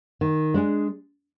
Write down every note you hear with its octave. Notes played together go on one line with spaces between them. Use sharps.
D#3
G#3 D4 G#4